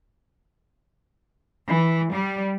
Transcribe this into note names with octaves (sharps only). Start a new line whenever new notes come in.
E3
G3